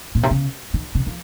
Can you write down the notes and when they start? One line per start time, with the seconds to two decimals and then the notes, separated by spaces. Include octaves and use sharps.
0.15 A#2
0.23 C3
0.31 C#3
0.74 D#3
0.95 C#3
1.06 F3